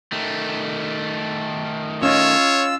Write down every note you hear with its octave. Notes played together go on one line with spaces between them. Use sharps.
D#3 A3
C#4 F4 C#5 D#5 E6